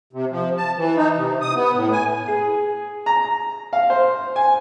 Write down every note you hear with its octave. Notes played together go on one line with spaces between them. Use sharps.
C3
F3
A5
E3
D#4
C3
D#6
B3
A2
G#5
G#4
A#5
F5
C5
G#5